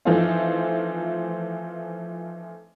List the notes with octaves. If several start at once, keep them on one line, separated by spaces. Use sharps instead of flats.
E3 F3 A3 C4 D#4 F4